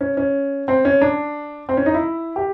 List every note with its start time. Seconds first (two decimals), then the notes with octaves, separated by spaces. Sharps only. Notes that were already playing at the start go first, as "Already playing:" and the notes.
0.01 C#4
0.17 C#4
0.68 C4
0.85 C#4
1.02 D4
1.69 C4
1.77 C#4
1.86 D#4
1.94 E4
2.36 G4